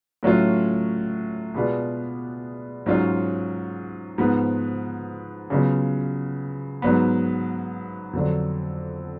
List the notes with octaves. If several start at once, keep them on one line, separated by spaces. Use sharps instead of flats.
A2 F#3 C#4 F4
B2 G#3 B3 D4 F4
G#2 F#3 C#4 F4
G#2 F3 B3
C#3 F#3 B3 F4
G#2 F#3 B3
F2 D3 F#3